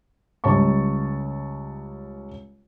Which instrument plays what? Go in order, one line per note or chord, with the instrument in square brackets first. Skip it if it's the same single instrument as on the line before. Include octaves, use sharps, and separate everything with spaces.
[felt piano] C#2 G3 C#5 A5 C#6